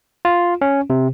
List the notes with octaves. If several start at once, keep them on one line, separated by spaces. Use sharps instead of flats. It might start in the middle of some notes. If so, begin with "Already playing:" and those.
F4
C#4
C3